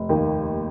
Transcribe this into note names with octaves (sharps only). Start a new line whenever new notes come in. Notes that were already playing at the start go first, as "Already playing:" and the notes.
Already playing: F1
D#2 D#3 A#3